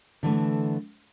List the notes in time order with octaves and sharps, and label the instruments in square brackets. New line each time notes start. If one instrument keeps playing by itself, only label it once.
[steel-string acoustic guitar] D3 E3 A3